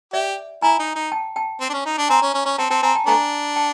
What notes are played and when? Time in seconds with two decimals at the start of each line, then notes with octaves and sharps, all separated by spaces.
0.13 G4 D5 E5
0.62 E4 G#5 A#5
0.79 D#4
0.96 D#4
1.12 G5 A5
1.36 G5 A5
1.61 C4
1.69 D4
1.73 C#4
1.86 D#4
1.98 D4
2.09 C4 G#5 A#5
2.22 C#4
2.34 C#4
2.46 C#4
2.58 C4 G5 A5
2.70 C4 G5 A5
2.82 C4 G#5 A#5
2.95 G5 A5
3.07 A3 B3 D4 G#5 A#5
3.56 G5 A5